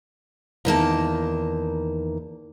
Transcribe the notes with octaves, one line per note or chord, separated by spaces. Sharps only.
E2 D#3 A#3 A5